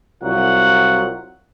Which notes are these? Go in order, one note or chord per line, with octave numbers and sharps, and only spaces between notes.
C2 F#3 F4 F#5